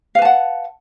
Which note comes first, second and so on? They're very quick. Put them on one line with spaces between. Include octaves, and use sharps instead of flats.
F5 B4 A5 F#5